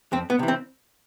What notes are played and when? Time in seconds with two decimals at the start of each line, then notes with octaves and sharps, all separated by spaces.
0.12 F2 C4
0.30 B3
0.39 C3 E3
0.48 C4